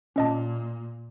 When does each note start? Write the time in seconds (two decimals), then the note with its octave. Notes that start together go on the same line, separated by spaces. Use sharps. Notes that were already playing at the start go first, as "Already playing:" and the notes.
0.16 A#2 C#4 D#5 A5